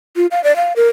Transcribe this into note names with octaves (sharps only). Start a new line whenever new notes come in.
F4
F5
D5
F5
A#4